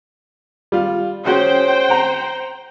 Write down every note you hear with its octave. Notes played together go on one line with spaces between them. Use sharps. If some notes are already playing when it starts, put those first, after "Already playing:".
G3 F4
C#4 F#4 G#4 C5 G5
F#5 A#5